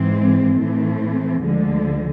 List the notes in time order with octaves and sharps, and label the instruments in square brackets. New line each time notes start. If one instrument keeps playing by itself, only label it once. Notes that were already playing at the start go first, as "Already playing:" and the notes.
Already playing: [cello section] G#2 E3 G#3 C4
A2 E3 A3 C4
D2 D3 F3 G#3